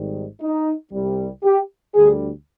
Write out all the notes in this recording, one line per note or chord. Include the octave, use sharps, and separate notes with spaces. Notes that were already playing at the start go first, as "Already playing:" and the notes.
Already playing: G#1 G#2 D#3 G3
D#4
C2 C3 G3
G4
D2 D3 G3 G#4